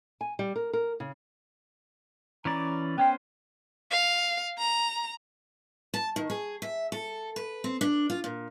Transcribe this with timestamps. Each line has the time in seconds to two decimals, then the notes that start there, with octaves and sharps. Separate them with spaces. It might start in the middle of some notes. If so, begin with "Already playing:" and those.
0.21 G#5
0.39 G3
0.56 A#4
0.73 A#4
1.00 C#3
2.45 E3 C#4 D5 A#5
2.98 B3 C#4 C5 G5
3.91 F5
4.58 A#5
5.94 A5
6.16 D#3
6.30 G#4
6.62 E5
6.92 A4
7.36 B4
7.64 C4
7.81 D4
8.10 F4
8.24 A#2